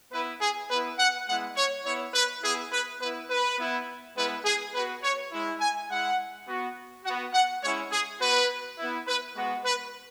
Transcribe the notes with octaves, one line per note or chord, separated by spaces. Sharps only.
B3 E4 B4
G#4
B3 E4 B4
F#5
G#3 B3 E4 F#5
C#5
B3 E4 C#5
B4
B3 E4 G#4
B4
B3 E4 B4
B4
B3 E4
G#3 B3 E4 B4
G#4
B3 F#4 B4
C#5
G#3 E4
G#5
G#3 E4 F#5
B3 F#4
F#4 F#5
B3
F#5
G#3 C#4 E4 C#5
G#4
B3 F#4 B4
B3 E4
B4
G#3 B3 F#4
B4